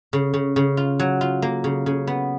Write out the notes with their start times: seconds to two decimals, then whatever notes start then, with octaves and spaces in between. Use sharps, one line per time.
0.13 C#3
0.34 C#3
0.56 C#3
0.77 F4
0.99 F#3
1.21 F4
1.42 A#3
1.64 C#3
1.86 C#3
2.07 B3